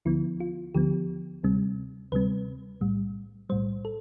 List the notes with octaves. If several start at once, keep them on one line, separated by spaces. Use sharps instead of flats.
D2 D3 F3 B3 E4
F4
D2 D3 F3 B3 G4
D2 C3 G3 C4
D2 C3 G3 C4 B4
B1 A2 G3
B1 A2 G3 C5
A4